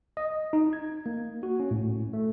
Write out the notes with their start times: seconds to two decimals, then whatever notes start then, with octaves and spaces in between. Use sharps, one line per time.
0.17 D#5
0.53 D#4
0.73 G#6
1.06 A#3
1.43 F#4
1.60 C#4
1.71 A2
2.13 A3